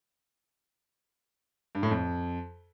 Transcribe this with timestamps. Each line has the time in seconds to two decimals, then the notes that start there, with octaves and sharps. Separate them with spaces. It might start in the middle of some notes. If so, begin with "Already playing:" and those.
1.75 G2
1.83 A2
1.91 F2